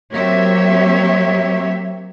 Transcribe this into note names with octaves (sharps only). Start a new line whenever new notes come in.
F#3 A#3 C4 G4 C#5 E5